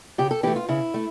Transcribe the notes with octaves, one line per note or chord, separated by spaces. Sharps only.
C#3 G4
A4
E3 A3 G4
F4
C#3 E4
A3